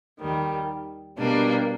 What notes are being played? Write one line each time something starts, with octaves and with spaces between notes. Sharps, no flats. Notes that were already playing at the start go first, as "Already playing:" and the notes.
D#2 D#3 G3
B2 G3 A#3 D4